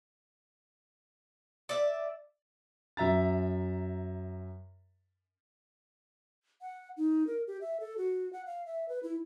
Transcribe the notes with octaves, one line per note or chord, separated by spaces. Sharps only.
D5 E5
F#2 E5 A#5 A6
F#5
D#4
A#4
G4
E5
A4
F#4
F#5
F5
E5
B4
E4